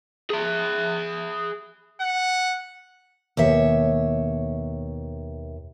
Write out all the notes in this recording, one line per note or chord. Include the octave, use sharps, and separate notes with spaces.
G#4 E5
F#5
D#2 B2 C#5 E5